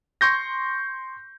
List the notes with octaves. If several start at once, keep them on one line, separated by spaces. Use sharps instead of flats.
C6 C#6 G6 A#6